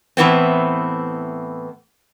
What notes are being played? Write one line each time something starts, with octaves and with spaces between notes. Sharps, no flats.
A2 E3 B3 C4